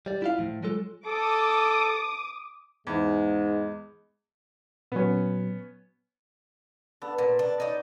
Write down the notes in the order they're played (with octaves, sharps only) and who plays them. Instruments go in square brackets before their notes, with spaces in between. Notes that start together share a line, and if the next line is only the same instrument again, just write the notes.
[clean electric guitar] G3 D5
E4 F4 F5
A2 F3
F#3 G#3 F4 A4
[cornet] A4 [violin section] D6 D#6
[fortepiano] E2 [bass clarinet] G#2 [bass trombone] G#3
[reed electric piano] A#2 F#3 [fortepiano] B3 C#4
[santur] B3 A4 [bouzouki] D4
[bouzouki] A#2
D4
D#4 C#5 D5